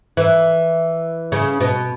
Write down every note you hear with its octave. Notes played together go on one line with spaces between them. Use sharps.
E3
C#3
B2